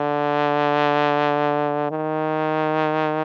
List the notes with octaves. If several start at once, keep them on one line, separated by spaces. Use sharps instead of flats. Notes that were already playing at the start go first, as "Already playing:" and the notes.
Already playing: D3
D#3